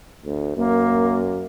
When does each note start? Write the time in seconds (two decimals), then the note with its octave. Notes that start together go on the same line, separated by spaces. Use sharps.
0.25 D2
0.57 F#2 A#3